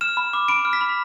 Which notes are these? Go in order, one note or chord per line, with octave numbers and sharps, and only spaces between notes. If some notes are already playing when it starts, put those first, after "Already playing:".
F6 E7
B5
D6
B5 D7
F6
B6
B5